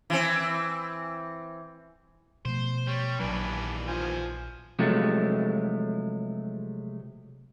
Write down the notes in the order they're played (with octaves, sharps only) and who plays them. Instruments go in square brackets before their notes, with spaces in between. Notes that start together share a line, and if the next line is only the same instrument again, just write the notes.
[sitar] E3 C4
[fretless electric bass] B2 F3 A3 [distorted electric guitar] C5
[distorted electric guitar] G3 [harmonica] C#5
[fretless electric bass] A#1 F#3 [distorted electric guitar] D#2 E3 [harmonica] D4 B4 G#5
[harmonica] F3 G#5
[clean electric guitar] C3 F3 F#3 G#3 A3